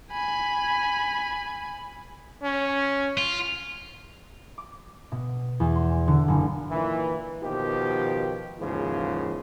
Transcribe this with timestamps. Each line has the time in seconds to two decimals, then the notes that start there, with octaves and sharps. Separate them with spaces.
0.12 G#5 B5
2.43 C#4
3.18 F4
4.58 D6
5.12 B2
5.60 E2
5.76 C6
6.08 D3
6.28 F#1
6.70 A#2 D#3 E3
7.41 B2 D#3 F3 G4
8.59 D#2 G#2 C#3 E3 F3